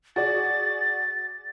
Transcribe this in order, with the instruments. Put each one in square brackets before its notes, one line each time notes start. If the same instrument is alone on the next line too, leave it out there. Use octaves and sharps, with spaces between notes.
[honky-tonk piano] F#4 G#4 D5 [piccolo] A6